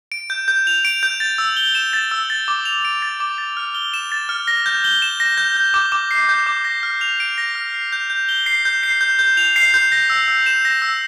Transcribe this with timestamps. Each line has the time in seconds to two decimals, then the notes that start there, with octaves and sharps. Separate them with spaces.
0.12 D7
0.30 G6
0.48 G6
0.67 F7
0.85 D7
1.03 G6
1.20 A6
1.38 E6
1.57 G7
1.75 E7
1.93 A6
2.11 E6
2.30 A6
2.48 D6
2.65 F7
2.85 D7
3.02 A6
3.20 D6
3.38 A6
3.57 F6
3.75 G7
3.94 E7
4.12 A6
4.29 F6
4.48 A#6
4.66 G6
4.84 G7
5.02 E7
5.20 A#6
5.38 G6
5.57 G6
5.74 D6
5.92 D6
6.11 C7
6.29 G6
6.46 D6
6.65 A#6
6.83 F6
7.01 F7
7.20 D7
7.38 A#6
7.55 F6
7.74 C7
7.92 G6
8.10 G6
8.29 G7
8.46 C7
8.65 G6
8.83 C7
9.01 G6
9.19 G6
9.37 F7
9.56 C7
9.74 G6
9.92 A#6
10.10 E6
10.28 E6
10.46 E7
10.65 A#6
10.82 E6